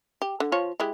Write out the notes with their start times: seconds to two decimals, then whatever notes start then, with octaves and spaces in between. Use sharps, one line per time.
0.22 G4
0.40 D3
0.52 F3 F4 C#5
0.80 G#3 E4 G4